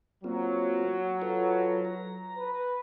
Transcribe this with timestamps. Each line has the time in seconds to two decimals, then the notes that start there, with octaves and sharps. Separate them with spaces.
0.24 F#3 A#3 C4 F4
1.22 F4 A4 B4
1.85 A#5
2.38 B4